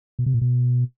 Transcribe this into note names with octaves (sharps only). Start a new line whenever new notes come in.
B2
C3
A#2
B2